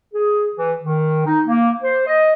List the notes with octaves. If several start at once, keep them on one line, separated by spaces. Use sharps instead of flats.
G#4
E3
D#3
D#4
A#3
C5
D#5